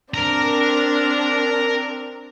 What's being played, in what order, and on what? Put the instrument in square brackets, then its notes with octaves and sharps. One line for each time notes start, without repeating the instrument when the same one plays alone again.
[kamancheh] C4 D4 [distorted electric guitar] A#4 A#5